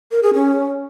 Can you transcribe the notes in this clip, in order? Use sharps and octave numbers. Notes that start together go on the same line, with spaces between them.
A#4
G#4
C#4